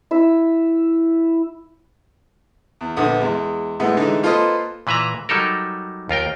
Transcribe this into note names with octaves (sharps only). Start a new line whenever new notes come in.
E4 E5
E2
A#1 D3 B3 D#6
E2 G#3
A2 G#3 B3
D3 E3 G#3 D#4
A#3 F4 A4 B4 C5 D#5
A#2 E3 B4 E5 A#5
F#3 G3 D#4 A4 A#4
D#2 F4 A#4 G5